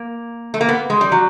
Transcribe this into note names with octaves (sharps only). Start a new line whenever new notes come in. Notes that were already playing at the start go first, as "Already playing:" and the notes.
Already playing: A#3
A3
A#3
B3
G#3
G3
F#3